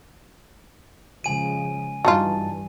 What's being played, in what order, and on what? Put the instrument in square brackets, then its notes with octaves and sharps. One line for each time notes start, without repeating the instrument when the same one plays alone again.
[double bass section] C#3 F3 G#3 [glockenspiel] G#5 D#7
[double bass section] G2 E3 [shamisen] F#3 D#4 F4 [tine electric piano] A5